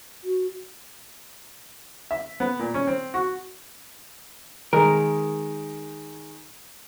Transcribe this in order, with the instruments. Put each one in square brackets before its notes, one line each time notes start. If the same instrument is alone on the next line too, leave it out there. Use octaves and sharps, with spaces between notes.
[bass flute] F#4
[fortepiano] E5
B3
A#2
C#4
C4
F#4
[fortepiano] D#3 G#3 [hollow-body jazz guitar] A#4